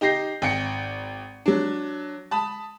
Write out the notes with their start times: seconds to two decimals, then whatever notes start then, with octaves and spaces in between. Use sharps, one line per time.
0.01 D#4 G4 G6 A#6 C7
0.42 G#1 G5 C#7
1.46 F#3 D4
2.31 A5 B5 D#6